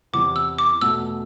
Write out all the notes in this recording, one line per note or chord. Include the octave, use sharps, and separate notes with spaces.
E2 C3 E3 D6
E6
D6
E2 B2 A3 E6